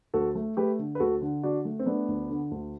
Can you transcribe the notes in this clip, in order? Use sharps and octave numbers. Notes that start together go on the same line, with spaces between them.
D2 F#4 A4
A3
A3 G4 B4
D3
B4
D2 F#4 A4
D3
D3 D4 F#4
A3
C4
A3 B3 D4
D2
D3
D2